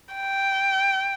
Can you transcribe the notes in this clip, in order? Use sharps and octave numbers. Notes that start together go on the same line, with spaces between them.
G5